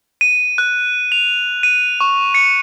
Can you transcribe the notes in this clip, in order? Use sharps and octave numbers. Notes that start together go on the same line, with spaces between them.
D#7
F#6
F7
D#7
C#6
C#7